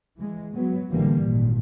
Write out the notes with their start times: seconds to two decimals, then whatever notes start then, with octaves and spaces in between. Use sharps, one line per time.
0.16 E3 G#3
0.53 F#3 B3
0.91 A1 D3 E3 G3 A#3
1.23 G#1 A#2